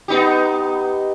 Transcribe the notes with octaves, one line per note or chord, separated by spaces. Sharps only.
B3 D#4 G4